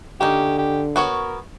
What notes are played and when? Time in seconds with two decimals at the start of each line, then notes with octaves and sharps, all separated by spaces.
0.21 D3 A#3 C#4 D#4 G4
0.58 G4
0.96 B3 F#4 A#4 C#5